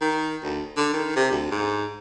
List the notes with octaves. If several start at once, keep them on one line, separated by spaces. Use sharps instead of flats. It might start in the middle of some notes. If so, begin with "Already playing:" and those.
D#3
D2
D3
D#3
C3
D2
G#2